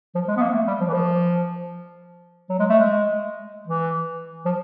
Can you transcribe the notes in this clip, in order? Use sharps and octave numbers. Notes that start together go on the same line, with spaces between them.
F3
G#3
B3
A#3
A3
G3
F3
E3
F3
F#3
G#3
A3
G#3
E3
F3